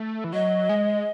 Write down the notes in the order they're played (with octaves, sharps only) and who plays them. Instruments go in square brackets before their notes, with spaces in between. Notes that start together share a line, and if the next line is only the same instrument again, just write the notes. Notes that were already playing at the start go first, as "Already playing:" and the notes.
Already playing: [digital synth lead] A3
E3
[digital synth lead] F#3 [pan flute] D#5
[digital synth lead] G#3